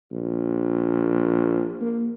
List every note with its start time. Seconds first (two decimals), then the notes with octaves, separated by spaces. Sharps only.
0.11 A#1
1.81 A#3